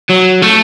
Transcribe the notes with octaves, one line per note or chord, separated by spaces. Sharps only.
F#3
A3